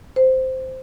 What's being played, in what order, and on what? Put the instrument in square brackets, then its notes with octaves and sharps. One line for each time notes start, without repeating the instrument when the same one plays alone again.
[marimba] C5